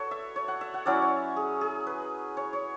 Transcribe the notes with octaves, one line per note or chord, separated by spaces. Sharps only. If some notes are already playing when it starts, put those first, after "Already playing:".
Already playing: F#4 A4 B4 C#5
E5
C#5
F#5
E5
F#5
F#3 C#4 E4 D5
C#5
G#4
G#4
B4
C#5
C#5